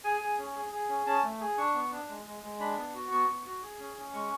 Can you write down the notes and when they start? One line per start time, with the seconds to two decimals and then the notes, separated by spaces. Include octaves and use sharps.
0.04 G#4 G#5
0.21 G#4
0.38 C#4
0.55 G#4
0.72 G#4
0.89 C#4
1.06 C#4 A5
1.24 A3
1.41 G#4
1.58 D4 C#6
1.75 B3
1.92 D4
2.09 G#3
2.26 G#3
2.43 G#3
2.60 D4 B5
2.77 B3
2.94 F#4
3.11 B3 C#6
3.28 B3
3.46 F#4
3.63 G#4
3.79 C#4
3.97 C#4
4.13 G#3 C#6